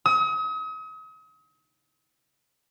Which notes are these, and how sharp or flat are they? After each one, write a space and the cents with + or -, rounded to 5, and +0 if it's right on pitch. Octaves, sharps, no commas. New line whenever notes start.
D#6 +40